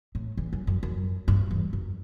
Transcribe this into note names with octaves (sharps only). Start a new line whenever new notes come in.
A2
E2
F#2
F#2
F#2
G2
E2
F#2